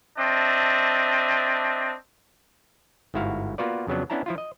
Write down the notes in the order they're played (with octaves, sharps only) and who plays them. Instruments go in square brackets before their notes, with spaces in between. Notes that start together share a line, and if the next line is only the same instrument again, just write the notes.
[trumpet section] C4 D4 D#5 E5 A5
[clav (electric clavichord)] G1 G#2 E4 F#4 F5
A#3 B3 F4 F#4 B4 D5
F2 C#3 F#3 B3 D4
B3 C#4 D4 E4 A5 A#5
F3 E4 F4
D#5